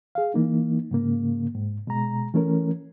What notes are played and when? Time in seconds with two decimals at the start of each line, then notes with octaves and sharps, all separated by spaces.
0.15 G#4 F5
0.34 E3 A#3 D#4
0.91 G#2 C#3 A#3
1.54 G#2
1.87 B2 G#3 A#5
2.34 E3 A3 C#4 A#4